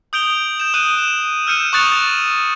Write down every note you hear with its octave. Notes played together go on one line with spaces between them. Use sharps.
D#6 G6 D7 F7 G7
G6 E7
D#6 F#6 D#7 E7
E7
E6 F6 G6 C#7 D#7 E7
C#6 D#6 F#6 A6 C#7 F7